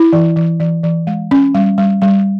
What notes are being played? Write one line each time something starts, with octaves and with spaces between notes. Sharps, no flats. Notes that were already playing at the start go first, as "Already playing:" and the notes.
Already playing: E4
E3
E3
E3
E3
G#3
C#4
G3
G3
G3